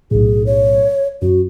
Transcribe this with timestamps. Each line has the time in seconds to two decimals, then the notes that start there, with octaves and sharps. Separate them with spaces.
0.11 B1 A2 G#4
0.46 C#5
1.22 F#2 F#4